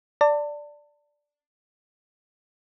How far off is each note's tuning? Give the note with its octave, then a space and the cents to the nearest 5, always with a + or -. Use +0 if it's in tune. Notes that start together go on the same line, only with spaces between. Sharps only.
D5 +0 A5 +35